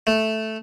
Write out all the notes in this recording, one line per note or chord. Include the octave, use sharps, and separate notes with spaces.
A3